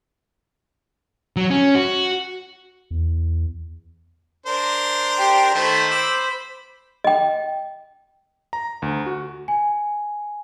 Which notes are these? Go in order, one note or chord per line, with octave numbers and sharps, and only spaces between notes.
F#3
C#4
F#4
E2
D4 A#4 C5
G4
D#3 A3 C5 B5
D6 E6
D#5 G5
A#5
D2
F#4
G#5